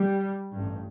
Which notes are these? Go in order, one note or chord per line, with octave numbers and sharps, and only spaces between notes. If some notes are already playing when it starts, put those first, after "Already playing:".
Already playing: G3
A1 G2